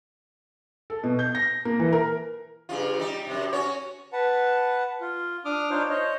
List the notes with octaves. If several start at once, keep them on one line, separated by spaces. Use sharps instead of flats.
A4
B2
G6
A#6
A#3
E3
A#4
G2 C#3 F4
G3 D#4
F#2 C3
C#4 F#4 C#5
B4 F#5 A5
F4
D4 D6 D#6 F6
D4 D#4 F4 C5 C#5
C5 C#5 D#5